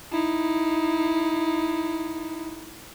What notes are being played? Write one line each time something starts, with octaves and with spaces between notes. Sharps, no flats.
D#4 E4